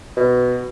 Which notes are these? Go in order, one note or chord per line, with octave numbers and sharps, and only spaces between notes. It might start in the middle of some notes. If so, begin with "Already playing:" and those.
B2